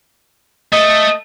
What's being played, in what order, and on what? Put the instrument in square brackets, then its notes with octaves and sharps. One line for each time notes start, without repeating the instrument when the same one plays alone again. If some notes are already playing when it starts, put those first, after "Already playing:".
[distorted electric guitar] A3 A4 [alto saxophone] D#5